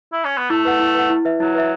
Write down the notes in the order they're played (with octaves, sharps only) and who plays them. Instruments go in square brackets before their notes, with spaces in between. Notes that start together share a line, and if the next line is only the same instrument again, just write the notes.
[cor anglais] E4
C#4
B3
[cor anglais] A3 [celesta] E4
[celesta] B4 F#5
E4
B4 F#5
E4
B4 E5
[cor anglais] F#3 [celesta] E4
[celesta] B4 E5